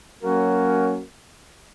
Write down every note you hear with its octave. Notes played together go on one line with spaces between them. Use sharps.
F#3 A#3 C#4 F#4 A#4